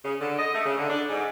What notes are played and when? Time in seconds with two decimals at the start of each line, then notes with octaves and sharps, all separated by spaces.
0.05 C#3
0.21 D3
0.39 D#5
0.54 A3
0.66 C#3
0.78 D3
0.90 D4
1.09 G#2